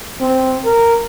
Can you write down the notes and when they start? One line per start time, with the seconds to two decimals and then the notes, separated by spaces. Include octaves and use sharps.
0.21 C4
0.65 A#4